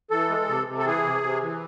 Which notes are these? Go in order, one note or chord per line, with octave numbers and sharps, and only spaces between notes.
E3 A4
G#3
C3
C3
A4
E3 G#4
C3
C3
E3